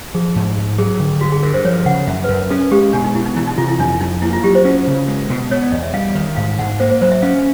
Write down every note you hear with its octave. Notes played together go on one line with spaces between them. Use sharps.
F3 G#4
G#2
G#2
F#3 G#4
D3
G2 F#4
G#4
G2 A#4
C5
F3 C#5
C#3 F#5
F#2 E5
B4
F#2 A#4
C#4 A4
G#3 G4
B2 D4
D#4
B2 E4
D#4
E3 E4
D#4
C3 F4
E4
F2 D4
F2 D#4
A#3 E4
F4
F#3 G4
C5
C#4
C#3
G#3
B2
B3 C#5
D5
E2 D#5
E5
G3 F5
D#3
G#2 F5
G#2 F#5
A#3 C5
C5
F#3 C5
E5
C#4 F5